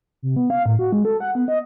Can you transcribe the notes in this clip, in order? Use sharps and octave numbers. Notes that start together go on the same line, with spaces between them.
C3
B3
F5
A2
F#4
G#3
A4
F#5
B3
D#5